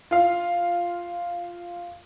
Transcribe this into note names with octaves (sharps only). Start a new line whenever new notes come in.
F4 F5